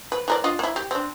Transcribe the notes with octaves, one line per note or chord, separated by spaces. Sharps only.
B4
E3 A#4 D5
D4 F4 D#5
A#3 E4
G4
C4 D4